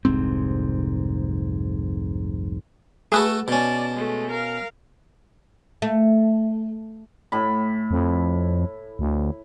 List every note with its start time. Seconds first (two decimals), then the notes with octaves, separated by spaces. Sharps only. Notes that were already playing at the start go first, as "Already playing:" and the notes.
0.05 F1 C2 G#2 C4
3.12 A3 F#4 G#4 A4 B4
3.48 B2 C#4 D5 A5
3.94 G#3 A3
4.31 A#4 F5
5.82 A3
7.32 A2 B5
7.91 F2
8.99 D2